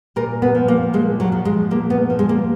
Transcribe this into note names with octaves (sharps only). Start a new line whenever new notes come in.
A#2 A#4
B3
F3
A#3
A#2 G#3
F#3
F3
G#3
A#2 A#3
B3
F3
G#3
A#3